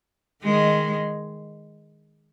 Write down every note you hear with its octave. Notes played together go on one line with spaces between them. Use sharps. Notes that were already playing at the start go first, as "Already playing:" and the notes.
D#3 G#3